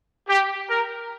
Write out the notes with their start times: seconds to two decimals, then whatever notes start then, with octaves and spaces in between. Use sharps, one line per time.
0.28 G4
0.69 A#4